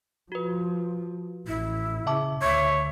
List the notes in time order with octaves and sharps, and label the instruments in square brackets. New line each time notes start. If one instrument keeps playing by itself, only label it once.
[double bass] F3 [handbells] F#4 B4
[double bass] A1 [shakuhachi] E4
[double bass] C#3 [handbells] E5 A5 D6
[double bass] D2 [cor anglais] C#5 [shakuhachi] E5 [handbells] D6 G6 G#6